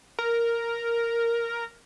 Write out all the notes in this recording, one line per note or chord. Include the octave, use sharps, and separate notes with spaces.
A#4